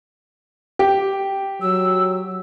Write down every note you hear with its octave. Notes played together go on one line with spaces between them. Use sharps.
G4
F#3 E6